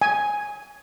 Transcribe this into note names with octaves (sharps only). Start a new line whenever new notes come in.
G#5